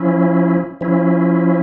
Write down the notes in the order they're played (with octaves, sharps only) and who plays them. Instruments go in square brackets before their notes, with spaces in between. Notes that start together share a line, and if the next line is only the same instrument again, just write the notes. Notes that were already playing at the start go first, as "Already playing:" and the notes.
Already playing: [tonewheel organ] F3 C#4 E4
F3 C#4 E4